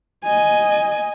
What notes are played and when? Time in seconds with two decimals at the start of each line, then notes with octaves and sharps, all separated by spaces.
0.24 D#5 G#5